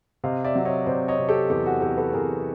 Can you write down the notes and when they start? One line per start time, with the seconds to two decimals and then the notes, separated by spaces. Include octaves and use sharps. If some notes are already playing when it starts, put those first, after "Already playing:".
0.24 C3 D#5 F5
0.44 D5 E5
0.55 F#3
0.65 C#5 D#5
0.86 C3 C5 D5
1.08 C#5 D#5
1.19 C3
1.28 G4 A4
1.50 E2 G4 A4
1.66 F#4 G#4
1.81 E2 G4 A4
1.97 A4 B4
2.13 E2 G#4 A#4